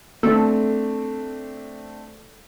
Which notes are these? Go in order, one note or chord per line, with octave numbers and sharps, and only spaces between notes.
A3 C4 D4 A4